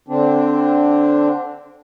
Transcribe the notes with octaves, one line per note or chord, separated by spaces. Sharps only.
D3 C4 D4